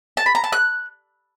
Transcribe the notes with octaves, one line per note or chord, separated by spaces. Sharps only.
A5
B5
A#5
A5
F#6